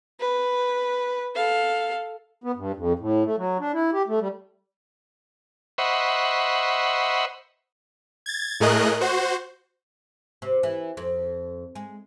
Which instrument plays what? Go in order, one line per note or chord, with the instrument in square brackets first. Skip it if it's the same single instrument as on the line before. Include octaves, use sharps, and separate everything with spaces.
[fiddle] B4
A4 F5
[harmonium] B3
G2
F2
A2
A3
F#3
D4
E4
G4
A3
G3
[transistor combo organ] C5 D#5 E5 F#5 B5 C#6
[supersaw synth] G#6 A6
A2 A3 G#4 A#4 D#5 F#6
F#4 C5
[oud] C3
E3
F2
G#3